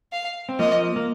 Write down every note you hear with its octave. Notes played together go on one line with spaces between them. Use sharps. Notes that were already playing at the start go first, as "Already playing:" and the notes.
F5
C4
F3 A#3 D#5
A#3